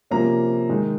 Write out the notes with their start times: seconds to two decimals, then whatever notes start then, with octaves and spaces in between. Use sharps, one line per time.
0.11 C3 F3 A#3 C#4 A#5
0.69 D#3 G#3 D#4